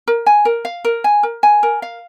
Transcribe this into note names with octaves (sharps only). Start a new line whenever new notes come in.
A#4
G#5
A#4
F5
A#4
G#5
A#4
G#5
A#4
F5